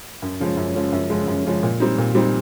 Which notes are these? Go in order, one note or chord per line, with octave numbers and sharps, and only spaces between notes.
F#2
C#3 F3 G#3 C#4
F#2
C#3 F3 G#3 C#4
F#2
C#3 F3 G#3 C#4
F#2
C#3 F3 G#3 C#4
A#2
G3 C4 D#4
A#2
G3 C4 D#4